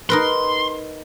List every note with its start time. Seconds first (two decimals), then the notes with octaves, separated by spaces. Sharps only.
0.10 D#4 A#4 B4 C6